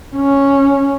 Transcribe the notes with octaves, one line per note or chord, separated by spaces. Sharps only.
C#4